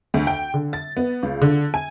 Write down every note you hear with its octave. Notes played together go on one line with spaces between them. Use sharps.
D2
G5
D3
A6
B3
C#2
D3
G#5